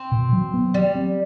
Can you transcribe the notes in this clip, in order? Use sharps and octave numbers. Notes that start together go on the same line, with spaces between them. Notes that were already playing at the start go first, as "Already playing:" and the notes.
Already playing: C4
B2
F#3
B3
F#3 G3
C4